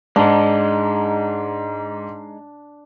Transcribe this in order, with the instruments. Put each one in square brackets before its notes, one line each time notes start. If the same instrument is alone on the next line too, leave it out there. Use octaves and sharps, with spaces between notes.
[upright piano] G#2 [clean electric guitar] G#3 D#4 [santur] D4